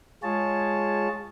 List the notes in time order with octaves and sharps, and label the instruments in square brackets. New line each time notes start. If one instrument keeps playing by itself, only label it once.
[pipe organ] G#3 F4 G#4 C#5 A5